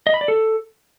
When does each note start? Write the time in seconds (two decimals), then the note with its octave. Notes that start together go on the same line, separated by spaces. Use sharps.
0.07 D#5
0.14 B5
0.21 D5
0.28 A4